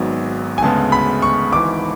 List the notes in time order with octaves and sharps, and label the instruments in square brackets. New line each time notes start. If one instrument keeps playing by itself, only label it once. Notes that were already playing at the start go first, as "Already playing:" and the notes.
Already playing: [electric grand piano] G#1 G#2 F#3 B3
[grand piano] G#5
[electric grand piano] D2 C#3 G#3 B3 [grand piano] A5
[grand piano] B5
C#6
[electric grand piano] G#1 G#2 E3 [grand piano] D6